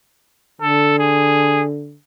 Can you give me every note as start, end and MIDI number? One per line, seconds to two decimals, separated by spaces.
0.61 1.97 50
0.61 0.95 69
0.99 1.63 68